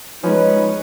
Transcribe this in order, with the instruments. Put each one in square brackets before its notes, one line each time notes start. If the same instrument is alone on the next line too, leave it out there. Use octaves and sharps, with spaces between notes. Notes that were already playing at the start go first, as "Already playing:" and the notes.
[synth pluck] F3 G#3 [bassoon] C#4 [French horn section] D#4 [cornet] B4